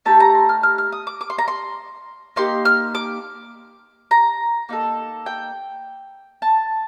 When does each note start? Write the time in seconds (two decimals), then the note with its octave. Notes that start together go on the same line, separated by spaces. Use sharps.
0.05 A3 D#4 G4 A5
0.20 A#5
0.35 C6
0.49 F6
0.63 F6
0.78 F6
0.92 D#6
1.07 D6
1.21 D6
1.30 C6
1.39 A#5
1.48 C6
2.36 A#3 D#4 G4 C6
2.65 F6
2.95 D6
4.11 A#5
4.69 A#3 D#4 A4
5.26 G5
6.42 A5